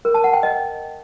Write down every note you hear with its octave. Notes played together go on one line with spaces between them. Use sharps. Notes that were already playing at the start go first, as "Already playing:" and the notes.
A#4
A5
F#5
G5
D#5